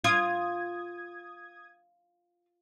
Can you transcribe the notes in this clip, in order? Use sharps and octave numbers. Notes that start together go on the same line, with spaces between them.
F4 D#6 G#6